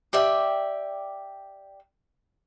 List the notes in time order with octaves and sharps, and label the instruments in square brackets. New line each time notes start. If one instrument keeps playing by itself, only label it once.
[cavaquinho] G4 D5 E5 G5